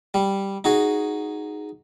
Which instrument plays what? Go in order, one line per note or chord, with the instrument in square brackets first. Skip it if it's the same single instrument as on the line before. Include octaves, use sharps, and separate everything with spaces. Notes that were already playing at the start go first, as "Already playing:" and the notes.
[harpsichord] G3
D#4 F#4 G#4